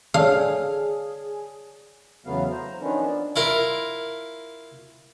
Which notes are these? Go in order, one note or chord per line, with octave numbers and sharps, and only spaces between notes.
G#4 C#5 D5 F5 A5
E2 C#3 F#3 A3 B3 F5
C5 A#5
D#3 F3 B3 C#4 D4
D4 D5
E4 F4 A#4